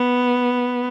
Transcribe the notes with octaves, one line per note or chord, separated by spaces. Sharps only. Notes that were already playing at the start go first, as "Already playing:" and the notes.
Already playing: B3